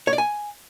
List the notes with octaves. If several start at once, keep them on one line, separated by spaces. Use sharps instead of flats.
C#5
D5
G#5